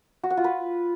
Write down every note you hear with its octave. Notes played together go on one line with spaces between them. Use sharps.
F#4
F#5
F4
B4